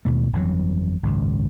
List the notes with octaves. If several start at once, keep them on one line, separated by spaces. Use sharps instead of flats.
D#2 B2 A3
G1 F2 E3 F#3
G#1 C#2 F#2